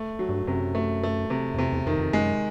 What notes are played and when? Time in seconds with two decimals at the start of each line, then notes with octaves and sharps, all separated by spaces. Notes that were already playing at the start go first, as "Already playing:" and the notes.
Already playing: A3
0.19 F#3
0.29 G2
0.47 F#2 C3
0.75 A3
1.03 A3
1.30 C3
1.54 F#2
1.58 F2 C3
1.72 E2
1.86 F2 D#3
1.99 F2
2.13 F#2 G#3